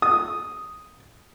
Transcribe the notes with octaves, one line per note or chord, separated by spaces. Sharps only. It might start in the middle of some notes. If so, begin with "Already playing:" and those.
D#6